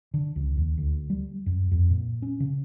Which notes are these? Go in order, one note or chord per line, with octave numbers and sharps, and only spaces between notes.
D3
C#2
D#2
D2
G3
F#2
F2
A#2
C#4
C#3